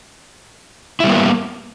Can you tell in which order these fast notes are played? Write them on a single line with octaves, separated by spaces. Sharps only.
E4 G3 B3 A#3